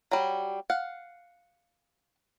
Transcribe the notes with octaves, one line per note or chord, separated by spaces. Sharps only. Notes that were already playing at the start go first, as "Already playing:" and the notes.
F#3 G3
F5 F#5